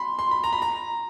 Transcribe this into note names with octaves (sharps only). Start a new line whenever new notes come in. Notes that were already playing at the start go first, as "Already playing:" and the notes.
Already playing: B5 C6
C6
B5
A#5
B5
A#5